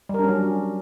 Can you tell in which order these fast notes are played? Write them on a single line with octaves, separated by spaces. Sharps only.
G3 A#4 D4 C#4 F#3